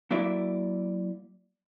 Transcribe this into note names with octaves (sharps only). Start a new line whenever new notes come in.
F#3 A#3 E4 D5 E5